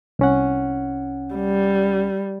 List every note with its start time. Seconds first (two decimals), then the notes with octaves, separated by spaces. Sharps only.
0.19 C2 C#4 F#5
1.35 G3